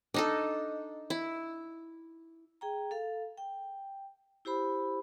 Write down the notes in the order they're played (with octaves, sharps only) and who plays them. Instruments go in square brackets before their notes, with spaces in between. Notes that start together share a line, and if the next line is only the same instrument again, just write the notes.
[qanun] D4 D#4 A4 [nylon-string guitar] D#5
[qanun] E4
[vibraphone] G#4 G5 A#5
A4 F5
G5
E4 G4 C5 B5